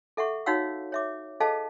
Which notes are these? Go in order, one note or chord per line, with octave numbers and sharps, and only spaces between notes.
A4 E5 F#5 C#6
D#4 F#4 C#5 F5 F#5 E6
C#5 E5 D6
G#4 A4 C5 D#5 F5 A5